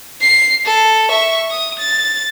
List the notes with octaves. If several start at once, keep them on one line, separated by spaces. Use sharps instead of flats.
C7
A4
E5 C#6
D#6
A6